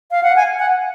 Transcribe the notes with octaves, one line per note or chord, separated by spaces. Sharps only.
F5
F#5
G#5
F#5